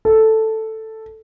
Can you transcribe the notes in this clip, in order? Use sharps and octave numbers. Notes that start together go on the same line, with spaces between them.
A4